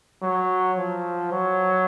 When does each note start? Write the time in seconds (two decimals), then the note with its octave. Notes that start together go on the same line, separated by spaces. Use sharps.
0.23 F#3
0.78 F3
1.32 F#3